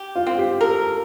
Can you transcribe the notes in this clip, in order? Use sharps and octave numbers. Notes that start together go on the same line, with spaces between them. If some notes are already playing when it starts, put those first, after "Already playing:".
Already playing: G4
F4
C4
G4
A4 A#4